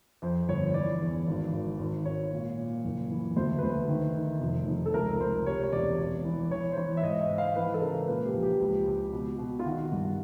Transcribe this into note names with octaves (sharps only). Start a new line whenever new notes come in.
F2 C5
G1 C#5
C#5
E3 D5
E2
G#1
G#1
G#1
G#1 C#5
A#2
A#2
F#1
E3
D2 C5
B4
D2 C5
D#3
D#3
F1
F1
A4
C#2 A#4
C#2 C5
C3 C#5
C#5
E1 D5
E1
E3
E3 C#5
C5
E3 C#5
E5
G#2 D#5
E5
G#2
F5
E3 B4
A4
C#3 A#4
A#2 B4
G4
A#1
G4
C#2
C#2
B2
B2
F4
D#3 F#4
G2